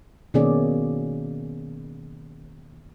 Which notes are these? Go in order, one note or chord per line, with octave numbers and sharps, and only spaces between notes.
B2 D#3 A#3 C#4 G#4 D5